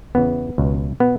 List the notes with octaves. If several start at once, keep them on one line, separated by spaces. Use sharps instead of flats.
E2 C#3 E3 B3
C#2 B2
B2 B3